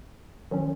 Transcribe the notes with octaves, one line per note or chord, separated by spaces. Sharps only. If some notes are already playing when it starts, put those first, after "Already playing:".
D#3 F#3 C#4